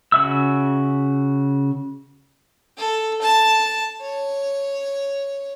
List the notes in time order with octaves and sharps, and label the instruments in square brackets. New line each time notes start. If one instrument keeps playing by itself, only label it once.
[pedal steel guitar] C#3 F#4 E5 E6
[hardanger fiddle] A4
A5
C#5